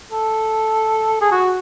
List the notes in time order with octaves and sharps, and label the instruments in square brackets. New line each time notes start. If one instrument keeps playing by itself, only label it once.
[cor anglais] A4
G#4
F#4